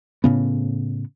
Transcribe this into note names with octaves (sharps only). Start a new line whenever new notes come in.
A2 C#3 B3